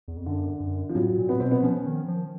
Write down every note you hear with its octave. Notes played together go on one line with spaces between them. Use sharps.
E2
F2
F#2 D3
F#2
F3
A2 F#3
A#2
B3
B2 C4
B3
F3 C#4
D#3
F3